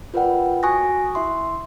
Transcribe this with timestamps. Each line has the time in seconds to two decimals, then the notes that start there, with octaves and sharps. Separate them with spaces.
0.14 F4 A#4 B4 D5 F#5 G5
0.63 F#4 G#5 C#6 D#6 F#6 A#6
1.15 E4 E5 C6